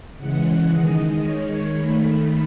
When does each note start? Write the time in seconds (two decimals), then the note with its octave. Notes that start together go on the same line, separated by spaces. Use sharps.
0.18 C#3 E3 G#3 F#5
0.70 D#3 G#3 D#5
1.23 D#3 G#3 C#5
1.76 D#3 A3 B5